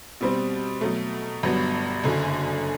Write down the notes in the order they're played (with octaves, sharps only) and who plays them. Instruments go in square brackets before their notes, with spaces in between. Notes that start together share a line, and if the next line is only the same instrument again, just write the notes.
[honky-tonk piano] B2 G3 C4
B2 F#3 A3
G1 G2 F#3 B3
F#1 F#2 D3